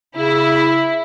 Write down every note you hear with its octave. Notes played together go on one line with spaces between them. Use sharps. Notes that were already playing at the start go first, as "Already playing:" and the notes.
C#3 E4